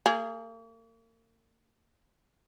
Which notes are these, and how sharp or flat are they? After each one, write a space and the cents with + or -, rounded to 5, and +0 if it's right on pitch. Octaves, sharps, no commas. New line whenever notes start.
A#3 -40 G#4 +0